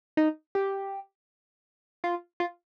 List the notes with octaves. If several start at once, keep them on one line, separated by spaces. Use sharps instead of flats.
D#4
G4
F4
F4